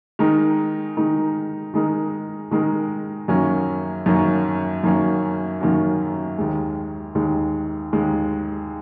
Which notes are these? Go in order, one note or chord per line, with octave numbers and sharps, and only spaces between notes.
D#3 G#3 D#4 A#4
D#3 G#3 D#4 A#4
D#3 G#3 D#4 A#4
D#3 G#3 D#4 A#4
F#2 D#3 A#3 C#4 F#4
F#2 D#3 A#3 C#4 F#4
F#2 D#3 A#3 C#4 F#4
F#2 D#3 A#3 C#4 F#4
D#2 D#3 G#3
D#2 D#3 G#3
D#2 D#3 G#3